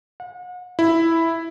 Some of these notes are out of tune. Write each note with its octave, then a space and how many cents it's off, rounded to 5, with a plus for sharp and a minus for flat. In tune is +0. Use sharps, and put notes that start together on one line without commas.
F#5 -40
E4 +0